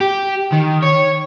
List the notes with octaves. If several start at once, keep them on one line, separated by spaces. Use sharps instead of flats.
G4
D#3
C#5